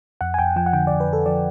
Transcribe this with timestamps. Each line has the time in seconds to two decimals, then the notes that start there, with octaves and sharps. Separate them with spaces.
0.21 F2 F#5
0.34 G#5
0.39 F2 G5
0.56 F3 G5
0.66 F#5
0.73 D3 G5
0.87 D5
0.92 F2
1.00 B4
1.08 F2 A4
1.26 F3 D5